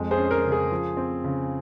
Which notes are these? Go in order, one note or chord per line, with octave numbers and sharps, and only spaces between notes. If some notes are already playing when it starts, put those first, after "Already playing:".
Already playing: F2 G#3
G#4 C5
C#4
A#4
C#3
G#4
F3
C4
C#3